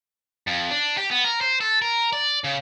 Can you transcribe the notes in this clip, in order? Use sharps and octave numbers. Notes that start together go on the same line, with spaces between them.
F2
D4
G4
B3
A#4
C5
A4
A#4
D5
C#3